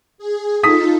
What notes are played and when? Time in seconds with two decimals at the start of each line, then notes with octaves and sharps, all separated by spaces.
0.18 G#4
0.63 D#4 F4 A4 D#6 B6